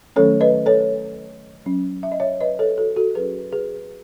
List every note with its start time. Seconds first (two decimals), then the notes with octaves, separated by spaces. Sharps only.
0.16 D#3 F#3 A3 C#4 A4 C#5
0.41 B4 D#5
0.66 A4 C#5
1.66 F#3 C#4
2.03 E5
2.12 D#5
2.20 C#5 E5
2.41 B4 D#5
2.59 A4 C#5
2.78 F#4 A4
2.96 F#4 A4
3.15 F#3 C#4 G#4 B4
3.52 G#4 B4